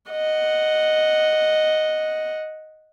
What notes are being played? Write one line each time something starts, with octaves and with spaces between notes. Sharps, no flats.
D#5 F#5